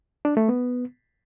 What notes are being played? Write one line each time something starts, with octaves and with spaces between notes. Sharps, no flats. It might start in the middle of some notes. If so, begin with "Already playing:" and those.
D4
A3
B3